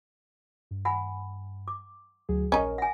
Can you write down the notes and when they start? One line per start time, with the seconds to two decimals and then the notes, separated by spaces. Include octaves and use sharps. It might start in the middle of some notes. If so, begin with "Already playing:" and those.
0.71 G2
0.85 F#5 G#5 B5
1.68 D6
2.29 D2 F#3 G#4
2.52 A#1 C#4 D#4 A#4
2.78 F#5 G#5 A#6